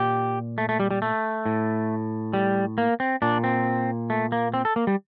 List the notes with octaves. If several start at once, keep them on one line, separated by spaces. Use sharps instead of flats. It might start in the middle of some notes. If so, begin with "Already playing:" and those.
Already playing: A#2 G4
A3
A3
G3
G3
A3
A2
G3
A#3
C4
A#2 D4
C4
A3
A#3
C4
A4
A#3
G3